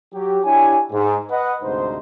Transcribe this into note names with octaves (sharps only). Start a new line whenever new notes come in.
F#3 G4
D4 E4 G4 C#5 G#5
G#2
B4 D#5 F#5
D2 G#2 C3 D#4 C5